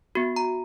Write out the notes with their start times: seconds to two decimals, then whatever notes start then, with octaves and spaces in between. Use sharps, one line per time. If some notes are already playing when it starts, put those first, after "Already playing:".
0.15 B3 F#4
0.36 A#5